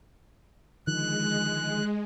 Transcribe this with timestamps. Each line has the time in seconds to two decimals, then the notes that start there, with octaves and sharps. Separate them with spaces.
0.87 D3 D#3 F3 G#3 F#6